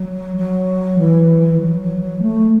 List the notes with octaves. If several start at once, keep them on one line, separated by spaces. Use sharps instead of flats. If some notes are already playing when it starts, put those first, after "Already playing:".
Already playing: F#3
F#3
E3
F#3
F#3
F#3
A3